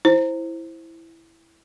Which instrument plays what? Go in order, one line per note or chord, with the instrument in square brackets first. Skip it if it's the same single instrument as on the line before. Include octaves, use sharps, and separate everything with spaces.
[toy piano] E4 [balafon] C5